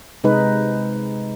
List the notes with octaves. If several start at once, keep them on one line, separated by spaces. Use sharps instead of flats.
C3 G#3 D#4 B4